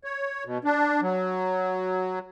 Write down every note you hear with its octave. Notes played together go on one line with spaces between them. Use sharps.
C#5
B2
D4
F#3